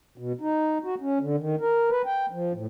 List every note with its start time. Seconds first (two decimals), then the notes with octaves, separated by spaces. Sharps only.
0.18 B2
0.41 D#4
0.84 F#4
1.00 C#4
1.21 D3
1.38 D#3
1.61 A#4
1.90 B4
2.06 G5
2.31 F3
2.52 A2